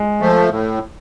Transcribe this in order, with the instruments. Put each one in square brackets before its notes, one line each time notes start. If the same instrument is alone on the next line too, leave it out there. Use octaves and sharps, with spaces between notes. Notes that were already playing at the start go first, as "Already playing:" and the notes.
Already playing: [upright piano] G#3
[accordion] F3 A3
A2